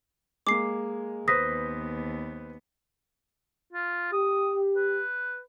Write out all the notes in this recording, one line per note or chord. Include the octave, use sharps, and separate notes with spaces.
G#3 A#3 D6 C7
D#2 B3 B4 C5 D#6 A#6 B6
F4
G4 D#6
B4